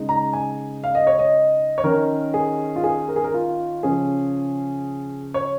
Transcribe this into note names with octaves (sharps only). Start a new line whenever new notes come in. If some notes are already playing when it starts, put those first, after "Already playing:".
Already playing: C#3 G#3 D#4
A#5
G#5
F5
D#5
C#5
D#5
C#5
D#3 C#4 A#4
G#4
F4
G#4
A#4
G#4
A#4
F4
C#3 F3 C#4 G#4
C#5